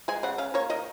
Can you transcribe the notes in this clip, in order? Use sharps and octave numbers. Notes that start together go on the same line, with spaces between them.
G#3 G#5
C#3 F#5
C#4 F5
A#3 C#5
D#3 D#5